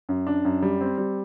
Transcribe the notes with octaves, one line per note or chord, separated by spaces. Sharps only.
F#2
D4
F#2
G3
C4
G3